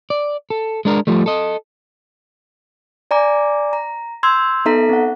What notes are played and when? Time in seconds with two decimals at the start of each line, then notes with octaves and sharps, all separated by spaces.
0.10 D5
0.50 A4
0.85 G#3 D4 A#4
1.07 F3 G3 A3
1.26 A4 D#5
3.11 D5 G#5 A#5 D6
3.73 A#5
4.23 C6 E6 G6 G#6
4.65 B3 D#4 A4 E5 A#5 B6
4.89 C4 F#5